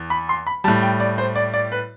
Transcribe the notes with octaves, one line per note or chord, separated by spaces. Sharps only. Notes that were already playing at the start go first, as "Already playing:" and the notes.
Already playing: E2
B5
C6
B5
A2 G3 A5
G5
D5
C5
D5
D5
B4